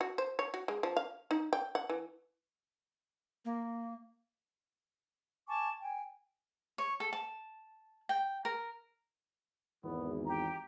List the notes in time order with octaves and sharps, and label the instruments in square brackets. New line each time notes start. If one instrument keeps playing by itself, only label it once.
[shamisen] F#4
C5
C#5
F#4
G#3
F3
F5
D#4
G5
F#5
E3
[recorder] A#3
[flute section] G#5 A5 C#6 D6
G5 G#5
[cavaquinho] C#5
A4
A5
G5
A#4
[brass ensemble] G#1 E2 [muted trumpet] B3
[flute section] G4 [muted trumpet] A#5